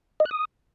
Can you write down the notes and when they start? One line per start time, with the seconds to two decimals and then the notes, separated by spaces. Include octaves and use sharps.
0.20 D#5
0.26 F#6
0.31 D#6